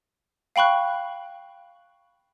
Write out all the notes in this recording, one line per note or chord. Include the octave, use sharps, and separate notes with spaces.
F5 G5 B5 C#6 F#6